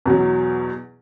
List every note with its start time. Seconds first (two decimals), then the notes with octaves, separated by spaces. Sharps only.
0.05 E2 B2 F#3